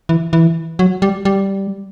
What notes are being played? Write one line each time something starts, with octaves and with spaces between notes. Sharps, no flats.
E3
E3
F#3
G3
G3